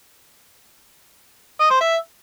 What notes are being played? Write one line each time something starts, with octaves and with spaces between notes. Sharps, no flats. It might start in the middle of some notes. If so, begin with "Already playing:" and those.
D#5
C5
E5